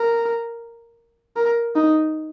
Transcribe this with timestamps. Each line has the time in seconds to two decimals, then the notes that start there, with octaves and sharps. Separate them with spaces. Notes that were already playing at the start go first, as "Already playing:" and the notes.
Already playing: A#4
1.36 A#4
1.75 D#4